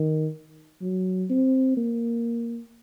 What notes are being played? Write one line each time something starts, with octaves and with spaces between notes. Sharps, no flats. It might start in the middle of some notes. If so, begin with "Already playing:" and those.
Already playing: D#3
F#3
C4
A#3